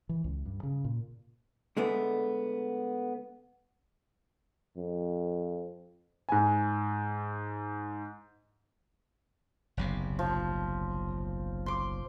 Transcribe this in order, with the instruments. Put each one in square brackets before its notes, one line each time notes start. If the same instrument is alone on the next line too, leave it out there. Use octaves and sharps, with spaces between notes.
[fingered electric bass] E3
C#2
G2
C#3
A#2
[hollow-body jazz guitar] D3 G#3 A3 B3
[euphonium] F2
[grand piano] G#2 G#5
[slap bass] F#1 B1 C3
[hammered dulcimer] F3
C6 D6